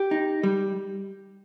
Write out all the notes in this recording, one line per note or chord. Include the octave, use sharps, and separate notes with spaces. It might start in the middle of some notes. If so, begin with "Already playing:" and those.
Already playing: G4
D#4
G3